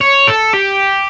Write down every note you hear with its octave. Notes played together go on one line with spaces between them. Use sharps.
C#5
A4
G4